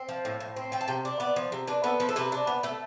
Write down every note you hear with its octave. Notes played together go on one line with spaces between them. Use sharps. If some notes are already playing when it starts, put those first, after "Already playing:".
Already playing: C4
F3
A2
A2
C4
F3 G5
A5
C3 G5
D4
B3 D5
F3
C3
D4 B4
B3 A4
F3 B4
A4
C3 B4
D4
B3
A3 A4